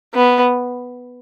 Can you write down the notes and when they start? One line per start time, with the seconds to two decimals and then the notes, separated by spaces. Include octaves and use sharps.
0.14 B3